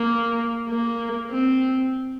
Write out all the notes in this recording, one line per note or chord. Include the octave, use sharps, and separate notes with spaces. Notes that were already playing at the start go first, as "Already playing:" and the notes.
Already playing: A#3
A#3
C4